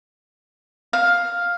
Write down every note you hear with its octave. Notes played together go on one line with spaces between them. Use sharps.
F5